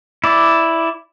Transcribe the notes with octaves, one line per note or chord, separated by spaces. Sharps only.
E4 D5